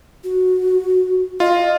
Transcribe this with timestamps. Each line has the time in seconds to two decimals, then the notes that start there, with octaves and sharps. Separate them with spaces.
0.24 F#4
1.40 F4 D#5